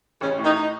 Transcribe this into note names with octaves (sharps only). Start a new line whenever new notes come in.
A1 C#3 C#4
A2
D#3 D#4
D#4